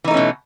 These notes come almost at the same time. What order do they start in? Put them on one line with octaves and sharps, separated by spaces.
E3 D#4 A3 C#4 B2